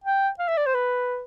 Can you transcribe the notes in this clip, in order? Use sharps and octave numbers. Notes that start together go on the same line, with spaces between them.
G5
F5
E5
D5
C5
B4